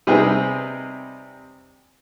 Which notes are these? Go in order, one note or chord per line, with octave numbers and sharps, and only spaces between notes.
C3 G3 C4 D#4 G#4 B4